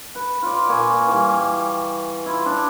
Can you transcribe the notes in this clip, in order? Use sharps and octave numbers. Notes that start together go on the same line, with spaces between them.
B4
F4 D5
A#2 G#5 C#6
E3 G3
E4 F4
D4